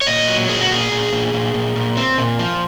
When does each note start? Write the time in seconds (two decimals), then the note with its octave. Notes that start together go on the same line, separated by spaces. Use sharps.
0.01 C#5
0.06 A#2 D#5
0.28 F#3
0.49 A#2 G#4
0.61 F#4
0.70 A#2 G#4
0.91 A#2
1.13 A#2
1.33 A#2
1.54 A#2
1.76 A#2
1.97 C4
2.18 A#2
2.39 F3